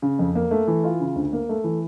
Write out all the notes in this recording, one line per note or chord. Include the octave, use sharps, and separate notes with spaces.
C#3
F2
A#3
A3
E3
F4
C#3
D2
A#3
A3
E3